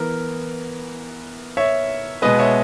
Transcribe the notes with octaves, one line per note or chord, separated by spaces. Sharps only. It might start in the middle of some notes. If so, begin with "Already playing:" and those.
Already playing: E3 B3 A#4
C#5 E5
B2 G#3 B3 B4 D#5
C#5 E5